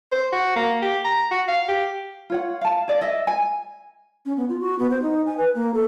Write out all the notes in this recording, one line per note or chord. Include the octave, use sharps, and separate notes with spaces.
C5
F#4
A#3
G4
A#5
F#4
F5
G4
F4 C#5 F#5
F5 A5
G#4 D5
D#5 E5
G#5
C#4
B3
F4
F#4
B3
C5
D#4
G#5
B4
A#3
A4